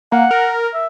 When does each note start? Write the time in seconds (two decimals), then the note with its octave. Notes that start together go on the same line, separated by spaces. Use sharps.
0.12 A#3 F#5
0.31 A#4
0.73 E5